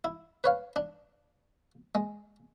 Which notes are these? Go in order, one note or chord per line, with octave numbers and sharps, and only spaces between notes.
E4
B4 C#5 F5
D4
G#3